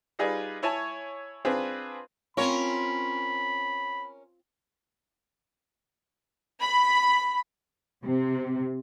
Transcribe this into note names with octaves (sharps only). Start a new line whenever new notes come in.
G3 D#4 F4 G#4 B4 D5
E4 C#5 G#5 A5
C4 D4 F4 G#4 B4
C4 C#4 F4 A#4 C#5 B5
B5
C3